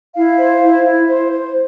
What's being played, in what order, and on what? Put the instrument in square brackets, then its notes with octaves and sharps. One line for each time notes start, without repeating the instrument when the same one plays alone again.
[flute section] E4 F5
C5
E4
E4
C5
C5